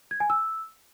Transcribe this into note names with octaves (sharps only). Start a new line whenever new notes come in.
G#6
G#5
E6